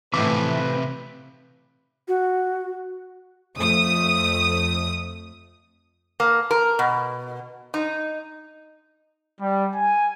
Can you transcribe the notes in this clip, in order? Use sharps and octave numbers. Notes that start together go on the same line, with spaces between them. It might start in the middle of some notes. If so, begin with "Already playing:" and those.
A2 C3 E3 B4 E5 F5 D6
F#4
F2 A3 D#6
A#3
A#4
B2
D#4
G3
G#5